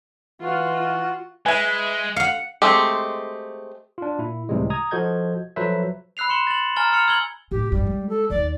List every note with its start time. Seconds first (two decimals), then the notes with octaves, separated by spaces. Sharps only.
0.42 E3 F4 F#4
1.46 G#3 B4 E5 G#5
2.16 F5 F#5 C#7
2.62 G#3 A3 C4 G4
3.98 D4 F4
4.19 A#2 E4
4.49 C#2 A2 C3 E3 G3 G#3
4.70 A#5 D#6 G#6
4.91 F3 F#4 A4 D#5 G6 G#6
5.56 F3 F#3 A4 B4 C5 E5
6.17 B5 E6 F#6 C7 F7
6.29 C6 C#7 E7 G7
6.47 A6 F#7
6.76 G#5 A#5 F6 A6 G7
6.91 A#5 E6 F6 C#7 F7 G7
7.08 E6 G#6 F#7 G7
7.51 A2 C3 G4
7.72 G2 G3
7.87 G#3
8.09 A4
8.30 D#2 D#4 D5